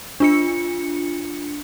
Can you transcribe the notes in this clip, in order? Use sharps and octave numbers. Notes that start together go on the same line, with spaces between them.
D4 F4 C#7